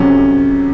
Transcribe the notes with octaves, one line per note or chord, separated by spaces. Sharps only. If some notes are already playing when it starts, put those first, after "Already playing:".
Already playing: F2 C3 F#3 C#4